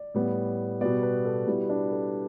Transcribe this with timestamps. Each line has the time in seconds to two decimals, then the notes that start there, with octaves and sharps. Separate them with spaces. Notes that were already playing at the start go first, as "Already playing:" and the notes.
Already playing: D5
0.14 A2 G3 B3
0.81 B2 G3 B3 D5
1.03 B4
1.25 A4
1.47 B2 G3 B3 E4
1.69 D4
1.92 A4